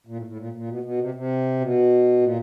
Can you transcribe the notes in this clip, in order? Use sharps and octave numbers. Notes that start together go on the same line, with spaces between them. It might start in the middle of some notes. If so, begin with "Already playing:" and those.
A#2
A2
A2
A#2
A#2
B2
B2
C3
C3
B2
A#2